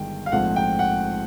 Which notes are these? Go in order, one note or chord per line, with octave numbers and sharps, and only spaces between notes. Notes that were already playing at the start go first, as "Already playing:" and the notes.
Already playing: G1 G2 D#3 G#3 G5
F5
A#1 G#2 F3 A3 C4 F#5
G5
F#5